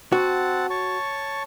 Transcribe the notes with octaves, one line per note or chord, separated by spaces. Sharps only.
C4 F#4 F#5 A5
C#5 A5 C#6